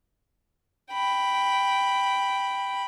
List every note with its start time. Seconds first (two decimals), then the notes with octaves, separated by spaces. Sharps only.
0.92 G5 B5